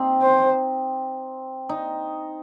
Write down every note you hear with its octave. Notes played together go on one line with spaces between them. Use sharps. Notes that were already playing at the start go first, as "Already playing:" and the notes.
Already playing: C4 D#4
C5
D#4